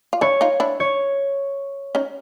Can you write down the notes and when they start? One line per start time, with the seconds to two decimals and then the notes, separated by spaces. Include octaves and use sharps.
0.13 F4
0.21 D4 E4 C#5
0.41 D#4 F4
0.60 D4 E4
0.80 C#5
1.95 C#4 D#4